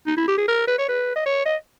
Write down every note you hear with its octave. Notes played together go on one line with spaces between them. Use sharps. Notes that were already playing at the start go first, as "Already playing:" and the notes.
D#4
E4
G4
G#4
A#4
B4
C#5
B4
D#5
C#5
D#5